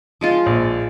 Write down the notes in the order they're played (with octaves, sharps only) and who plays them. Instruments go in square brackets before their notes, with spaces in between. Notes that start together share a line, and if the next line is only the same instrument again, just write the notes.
[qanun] F3 G#3 F4
[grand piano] A#1